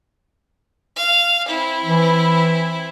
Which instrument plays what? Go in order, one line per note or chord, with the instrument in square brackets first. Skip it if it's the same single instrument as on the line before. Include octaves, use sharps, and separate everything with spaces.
[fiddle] F5
C4 E4
[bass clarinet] E3